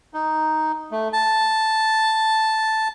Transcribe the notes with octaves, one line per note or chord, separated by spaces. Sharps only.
D#4
A3
A5